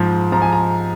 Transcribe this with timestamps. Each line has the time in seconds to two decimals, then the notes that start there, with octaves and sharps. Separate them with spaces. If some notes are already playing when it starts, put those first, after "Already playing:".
Already playing: G#2 F3
0.32 F3 A#5
0.42 G#5
0.52 A#5